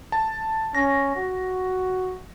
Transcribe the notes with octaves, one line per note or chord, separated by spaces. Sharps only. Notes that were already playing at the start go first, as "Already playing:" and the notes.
A5
C#4 A#6
F#4